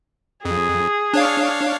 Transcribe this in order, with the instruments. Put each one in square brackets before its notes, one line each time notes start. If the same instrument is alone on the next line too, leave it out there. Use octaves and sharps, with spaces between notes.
[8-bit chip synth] F2 [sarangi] G#4
[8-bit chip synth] D4 C#5 F5